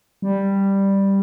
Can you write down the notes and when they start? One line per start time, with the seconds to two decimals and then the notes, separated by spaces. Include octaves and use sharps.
0.22 G3